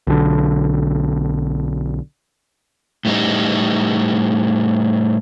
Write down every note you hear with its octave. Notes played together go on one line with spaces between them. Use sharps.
B1 D3
A2 G3 D#4